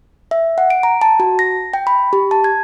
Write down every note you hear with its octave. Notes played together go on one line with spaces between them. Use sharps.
E5
F#5
D7
A#5
A5
F#4
A#6
G5
B5
G4
A5
G#6